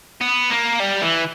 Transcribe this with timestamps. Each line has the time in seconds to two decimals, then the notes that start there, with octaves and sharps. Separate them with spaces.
0.21 B3
0.50 A#3
0.80 G3
1.02 E3